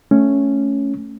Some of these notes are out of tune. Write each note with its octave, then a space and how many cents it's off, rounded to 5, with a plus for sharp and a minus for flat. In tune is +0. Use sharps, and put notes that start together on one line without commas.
A3 +0 C#4 +0